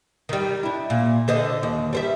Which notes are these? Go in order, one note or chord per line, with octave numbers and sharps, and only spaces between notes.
D#3 G3
D4 E4
A#2
D3 C5 D#5
D#2
G3 C5 E5